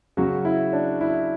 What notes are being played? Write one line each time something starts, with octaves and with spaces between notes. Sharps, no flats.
C#3 F#3 C#4 F#4
E4
D4
E4